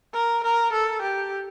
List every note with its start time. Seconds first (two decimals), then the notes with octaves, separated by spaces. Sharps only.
0.14 A#4
0.44 A#4
0.72 A4
1.02 G4